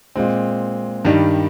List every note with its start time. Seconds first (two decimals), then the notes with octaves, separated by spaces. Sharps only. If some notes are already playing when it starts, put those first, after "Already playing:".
0.16 A#2 G#3 C4
1.05 G2 D#3 G3